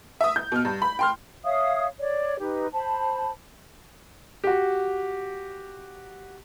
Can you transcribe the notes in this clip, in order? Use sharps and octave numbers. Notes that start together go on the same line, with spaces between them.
E5 D#6
G6
B2 F6
G2
B5
G5 C6 F6
C#5 E5 F5 D#6
C#5 D5
D#4 G4 B4
C5 A5 B5
F#4 G4